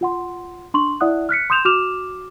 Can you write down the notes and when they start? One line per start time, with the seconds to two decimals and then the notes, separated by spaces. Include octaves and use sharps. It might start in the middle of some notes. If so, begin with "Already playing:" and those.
0.01 F4 F#5 C6
0.74 D4 C6 C#6 F#7
1.01 E4 D5 E5 F#5 D#6 F#6
1.29 F6 F#6 B6 C#7
1.50 C6 D#6 G6 E7 F7
1.65 F#4 D6 F6 E7 F7